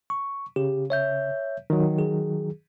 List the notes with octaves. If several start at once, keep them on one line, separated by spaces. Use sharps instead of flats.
C#6
C#3 G4
C#5 E5 G6
D#3 F#3
G#4